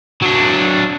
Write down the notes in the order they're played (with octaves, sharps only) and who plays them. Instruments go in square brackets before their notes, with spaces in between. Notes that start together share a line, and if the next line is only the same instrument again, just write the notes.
[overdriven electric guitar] F#3 D4